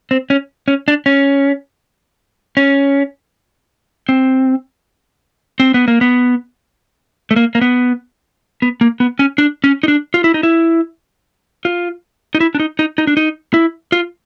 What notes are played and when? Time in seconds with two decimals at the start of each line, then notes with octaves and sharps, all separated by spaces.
0.11 C4
0.30 C#4
0.68 C#4
0.88 D4
1.06 C#4
2.57 C#4
4.09 C4
5.60 C4
5.74 B3
5.88 A#3
6.01 B3
7.31 A3
7.36 A#3
7.55 A#3
7.61 B3
8.62 B3
8.81 A#3
9.00 B3
9.19 C#4
9.38 D4
9.64 C#4
9.83 D#4
9.88 D4
10.14 F4
10.24 E4
10.34 D#4
10.43 E4
11.65 F4
12.35 D#4
12.40 E4
12.55 D4
12.60 D#4
12.79 D#4
12.98 D#4
13.07 D4
13.17 D#4
13.54 E4
13.92 F4